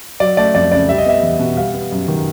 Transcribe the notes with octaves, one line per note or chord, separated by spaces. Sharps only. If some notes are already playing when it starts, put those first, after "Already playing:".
F#3 D5
A3 D5
F2 D5
C#3 D5
G3 E5
D#5
B3 E5
E2
B2
G3 F5
B3
F#2
D#3